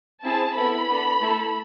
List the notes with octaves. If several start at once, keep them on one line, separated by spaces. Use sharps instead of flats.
C4 E4 G#4 A5
B3 E4 A4 B5
B3 D4 A4
A3 E4 A4